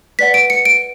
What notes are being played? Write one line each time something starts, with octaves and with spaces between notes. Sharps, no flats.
B4 D5 F#5 B6
D7
C#7
D7